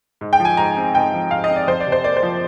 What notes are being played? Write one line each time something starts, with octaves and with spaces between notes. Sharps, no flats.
G#2
G5
F3
G#5
G#2 A#5
C4
G#2 G5
F3
G#2 F5
D#5
C4
D5
F2 C5
D5
C3
C5
A#3 D5
C5
F3